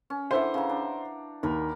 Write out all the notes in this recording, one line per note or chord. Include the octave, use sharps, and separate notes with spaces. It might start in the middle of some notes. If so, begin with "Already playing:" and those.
C#4
D3 E3 C5 E5 F#5
C#3 A#5
D4
D#2 A#4 B5